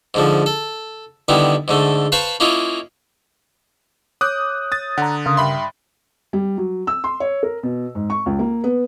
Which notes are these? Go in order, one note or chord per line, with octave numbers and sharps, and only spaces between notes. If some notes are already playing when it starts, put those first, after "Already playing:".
G#2 D3 F3
A4
D3 D#3 G3 B3 E4
G#2 D3 A3
B4 C5 F5 A5 B5 C#6
A#3 C#4 E4 F4 D#5
C#5 D6 D#6 F#6 G6
D#6 A6
D3 F#5 A#5
C#3 A#4 F5 C6 D#6
G2 E5 G5 B5 C6
G3
F#3
E6
C6
C#5
A#4
B2
G#2
C#6
C#2
A#3
B3